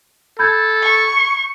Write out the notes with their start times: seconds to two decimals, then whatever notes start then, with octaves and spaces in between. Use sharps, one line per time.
0.39 A4 B5 G6 G#6
0.82 C#6